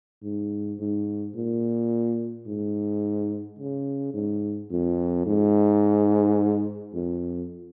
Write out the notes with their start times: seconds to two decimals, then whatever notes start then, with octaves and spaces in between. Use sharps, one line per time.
0.23 G#2
0.80 G#2
1.36 A#2
2.47 G#2
3.59 C#3
4.14 G#2
4.71 F2
5.26 G#2
6.94 F2